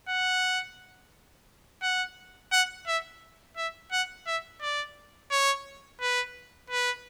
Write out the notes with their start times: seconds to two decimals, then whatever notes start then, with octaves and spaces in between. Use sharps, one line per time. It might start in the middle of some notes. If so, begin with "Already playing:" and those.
0.08 F#5
1.82 F#5
2.52 F#5
2.87 E5
3.57 E5
3.92 F#5
4.26 E5
4.61 D5
5.31 C#5
6.01 B4
6.70 B4